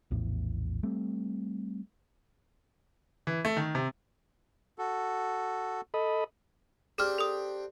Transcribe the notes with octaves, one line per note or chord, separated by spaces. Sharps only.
A#1 E2 A2
G3 A3 C4
E3
A3
D#3
C3
F#4 A4
A4 D#5 B5
C4 D4 G4 G#4 F6
A4 D#6